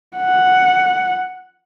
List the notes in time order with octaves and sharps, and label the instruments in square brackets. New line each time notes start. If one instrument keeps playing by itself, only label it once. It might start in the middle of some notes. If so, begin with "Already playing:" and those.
[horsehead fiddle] F#5